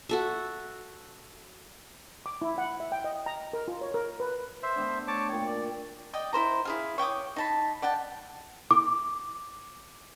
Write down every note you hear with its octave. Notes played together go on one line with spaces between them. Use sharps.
F#4 A4 E5
D6
E4
F#5
E5
G5
D#5
A#5
A#4
F4
C#5
A#4
B4
C5 E5
A3 B3 D4
C#5 A5 D6
A#2 C#5 G5
D5
D5 D#5 G5
E4 A#4 C5 A#5
E4 G#4 F5
C#5 G5 D6 D#6
D#4 A5 B5
D5 F#5 G5 A5
D6